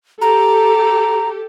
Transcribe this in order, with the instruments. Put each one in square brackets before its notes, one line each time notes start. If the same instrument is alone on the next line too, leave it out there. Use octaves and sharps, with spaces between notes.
[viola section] G4 A4 [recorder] A#5